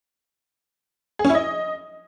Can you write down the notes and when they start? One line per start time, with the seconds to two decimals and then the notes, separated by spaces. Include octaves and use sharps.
1.19 G#4
1.25 C#4
1.30 E4
1.35 D#5